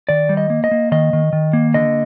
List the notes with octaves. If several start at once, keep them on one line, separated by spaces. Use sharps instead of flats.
D#3 D5
G3
D#5
A#3
D#5
A#3
D#3 D#5
D#3
D#3
A#3
D3 D#5